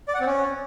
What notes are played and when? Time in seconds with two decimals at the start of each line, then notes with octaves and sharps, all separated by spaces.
0.08 D5
0.14 F#5
0.20 C4
0.26 C#4